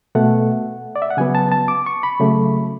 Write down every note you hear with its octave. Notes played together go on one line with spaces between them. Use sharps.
B2 A3 F#5
D5
E5
F#5
C#3 F#3 B3 G#5
A5
A5
D6
C#6
B5
C#3 F#3 A3